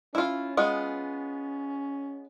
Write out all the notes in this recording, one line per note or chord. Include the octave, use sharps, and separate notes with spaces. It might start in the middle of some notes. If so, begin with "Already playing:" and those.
C#4 E4 F4
G#3 B3 F4